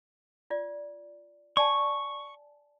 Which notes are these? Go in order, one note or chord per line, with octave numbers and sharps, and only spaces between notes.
F4 D5
D5 G#5 A5 C#6